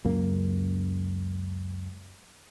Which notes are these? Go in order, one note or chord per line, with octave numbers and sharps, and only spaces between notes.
C#2 F#2 A#3